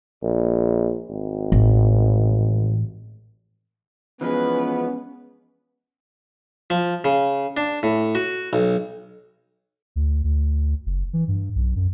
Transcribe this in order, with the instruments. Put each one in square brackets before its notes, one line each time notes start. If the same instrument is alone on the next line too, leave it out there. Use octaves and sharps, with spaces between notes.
[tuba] A#1
G#1
[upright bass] A1
[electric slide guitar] E3 F3 G#3 [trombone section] B3 [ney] C#4 [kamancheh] B4
[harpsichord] F3
C#3
D4
A2
F#4
B1
[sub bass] D2
D2
F#1
E3
G2
B1
F#2